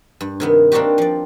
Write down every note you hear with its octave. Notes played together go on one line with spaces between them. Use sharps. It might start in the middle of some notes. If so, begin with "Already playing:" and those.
G2
C3 D#3 B3
A#3 C4 D4 D#4 F#4 G4
F3 D5